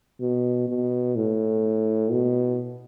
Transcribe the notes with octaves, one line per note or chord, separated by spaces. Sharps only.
B2
B2
A2
B2